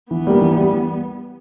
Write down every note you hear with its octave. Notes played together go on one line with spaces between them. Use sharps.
E3 B3
G3 A#3
E3
G3